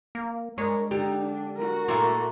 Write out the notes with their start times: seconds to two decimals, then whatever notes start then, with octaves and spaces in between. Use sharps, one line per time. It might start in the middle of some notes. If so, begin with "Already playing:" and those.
0.15 A#3
0.58 G#3 D4 A#4 C#5
0.91 D3 D#4 G4
1.24 D4
1.56 F#4 A#4
1.88 A#2 A3 A#3 E4